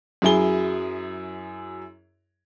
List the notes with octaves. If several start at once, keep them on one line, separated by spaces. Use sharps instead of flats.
F#2 F#3 E4 G#4 G7